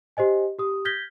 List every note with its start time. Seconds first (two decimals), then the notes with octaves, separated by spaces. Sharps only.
0.17 G4 C5 D#5 G#5
0.59 G4 D#6
0.85 F6 G6 G#6 A#6 B6 G7